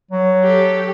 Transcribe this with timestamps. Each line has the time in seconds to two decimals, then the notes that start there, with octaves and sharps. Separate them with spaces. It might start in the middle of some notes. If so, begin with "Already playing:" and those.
0.11 F#3
0.44 G4 A4